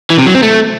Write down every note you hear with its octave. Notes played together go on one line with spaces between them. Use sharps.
E3
C3
F#3
C4
A3